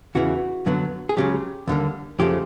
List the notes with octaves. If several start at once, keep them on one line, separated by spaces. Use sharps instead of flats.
E2 C#3 E3 F#4
F#2 D3 F#3 B3
G#4
C#2 C#3 F#3 G4
D#2 D3 G3 A#3
F2 C#3 F3 A3 G4